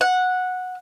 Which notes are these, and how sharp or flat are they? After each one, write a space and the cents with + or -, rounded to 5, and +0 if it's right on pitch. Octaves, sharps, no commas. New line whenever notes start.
F#5 -10